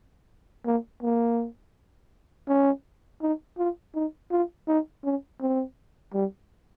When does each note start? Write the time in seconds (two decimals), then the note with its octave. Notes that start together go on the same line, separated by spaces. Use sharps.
0.66 A#3
1.03 A#3
2.49 C#4
3.21 D#4
3.58 F4
3.95 D#4
4.31 F4
4.68 D#4
5.04 C#4
5.41 C4
6.14 G3